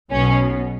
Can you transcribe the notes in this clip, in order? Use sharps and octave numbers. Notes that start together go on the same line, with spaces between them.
B1 B2 C#4